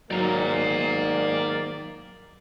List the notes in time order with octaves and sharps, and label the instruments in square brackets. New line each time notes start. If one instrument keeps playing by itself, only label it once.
[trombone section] G#2 D#3 A#3 [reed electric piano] F#3 [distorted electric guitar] D5 A#5